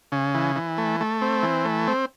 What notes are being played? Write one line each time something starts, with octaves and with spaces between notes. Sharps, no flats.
C#3
E3
E3
A3
A3
C4
E3
A3
C4